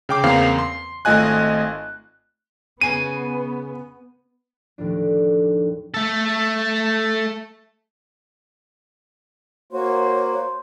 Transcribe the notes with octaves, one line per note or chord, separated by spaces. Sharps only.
C#3 G5 D6
E2 C#3 A#3 C4 F5 C7
C6
G#1 A3 F4 D#5 G#5 F#6
C#3 B3 G#5 D#7
D#2 A2 F3 D4
A3 A4
A#3 F#4 C5 C#5